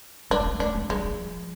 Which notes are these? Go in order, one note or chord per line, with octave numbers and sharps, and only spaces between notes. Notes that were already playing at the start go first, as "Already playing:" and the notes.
G3 D4
A3
G#3
A3 D4
G#3
G3 G#3
F3